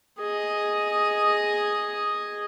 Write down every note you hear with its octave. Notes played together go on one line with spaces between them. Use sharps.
G#4 D#5